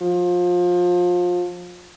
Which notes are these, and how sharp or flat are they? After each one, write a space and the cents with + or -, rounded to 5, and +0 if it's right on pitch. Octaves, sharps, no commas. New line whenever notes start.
F3 +25